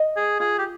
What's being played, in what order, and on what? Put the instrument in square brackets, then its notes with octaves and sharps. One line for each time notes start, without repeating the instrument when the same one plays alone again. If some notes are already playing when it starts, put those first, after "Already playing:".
Already playing: [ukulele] D#5
[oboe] G#4
[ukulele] F4 [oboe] G#4
[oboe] G4